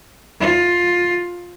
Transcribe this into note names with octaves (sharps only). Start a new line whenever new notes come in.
F4